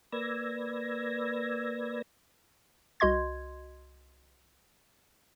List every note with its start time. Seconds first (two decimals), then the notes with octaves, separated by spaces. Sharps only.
0.12 A#3 B4 D5 E6 G#6 A#6
3.00 C2 F#4 D#5 C6 G#6